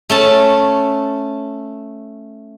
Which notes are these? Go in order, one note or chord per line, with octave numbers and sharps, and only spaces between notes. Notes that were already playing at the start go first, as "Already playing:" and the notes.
A3 C#4 A5